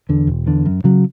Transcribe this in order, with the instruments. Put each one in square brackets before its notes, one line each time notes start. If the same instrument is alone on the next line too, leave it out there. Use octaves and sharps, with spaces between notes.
[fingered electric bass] E2 D3
E1
E2 D3
F#2
C#3 F#3